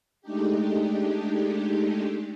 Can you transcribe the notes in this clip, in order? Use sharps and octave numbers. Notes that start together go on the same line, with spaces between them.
G#3 A3 D4 D#4 G4